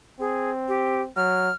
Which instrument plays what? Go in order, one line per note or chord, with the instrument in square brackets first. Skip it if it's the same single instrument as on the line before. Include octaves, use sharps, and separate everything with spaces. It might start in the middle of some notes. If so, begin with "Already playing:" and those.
[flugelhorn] C4 [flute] G#4
[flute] G4
[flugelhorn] F#3 [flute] F6